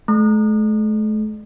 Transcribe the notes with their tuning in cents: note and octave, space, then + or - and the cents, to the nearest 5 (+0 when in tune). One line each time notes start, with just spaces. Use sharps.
A3 -40